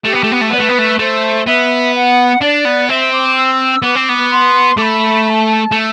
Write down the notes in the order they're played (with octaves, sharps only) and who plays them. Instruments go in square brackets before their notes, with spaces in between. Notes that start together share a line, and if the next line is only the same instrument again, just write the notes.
[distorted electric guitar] A3 [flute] G4
[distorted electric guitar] B3
A3
B3
A3
[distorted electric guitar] B3 [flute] D5
[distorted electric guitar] A3 [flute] B4
[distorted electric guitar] B3
A3
[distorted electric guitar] A3 [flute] C5
[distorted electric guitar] B3 [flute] E5
[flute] F#5
[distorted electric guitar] D4 [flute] D5
[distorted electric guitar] B3
[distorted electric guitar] C4 [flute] E5
[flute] D6
E6
[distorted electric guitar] B3 [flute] D6
[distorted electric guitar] C4
B3
[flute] C6
[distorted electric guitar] A3 [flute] D6
[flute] B5
B5
A5
[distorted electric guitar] A3